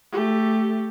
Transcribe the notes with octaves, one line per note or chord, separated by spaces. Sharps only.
A3 G4